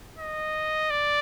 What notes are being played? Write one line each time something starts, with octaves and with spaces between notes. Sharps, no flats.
D#5
D5